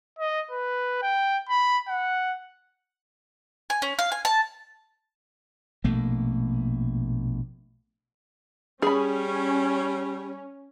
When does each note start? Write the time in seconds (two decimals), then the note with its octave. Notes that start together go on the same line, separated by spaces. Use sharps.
0.18 D#5
0.51 B4
1.02 G5
1.49 B5
1.88 F#5
3.70 G#5
3.82 C#4
3.99 F5
4.12 G#5
4.25 A5
5.84 A#1 B2 A3 A#3
8.82 G3 C#4 G#4 B5